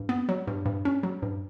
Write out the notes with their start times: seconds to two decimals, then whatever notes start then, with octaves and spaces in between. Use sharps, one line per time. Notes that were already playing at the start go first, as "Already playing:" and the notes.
Already playing: G2
0.09 B3
0.29 F#3
0.47 G2
0.66 G2
0.85 C#4
1.03 F#3
1.22 G2